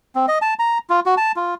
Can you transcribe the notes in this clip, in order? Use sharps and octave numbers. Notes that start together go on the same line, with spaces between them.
C4
D#5
A5
A#5
F4
F#4
A5
F4